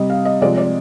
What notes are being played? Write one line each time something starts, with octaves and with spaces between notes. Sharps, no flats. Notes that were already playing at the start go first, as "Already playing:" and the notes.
Already playing: C3 G3 D#5
F5
D#5
C3 F3 G#3 D5
D5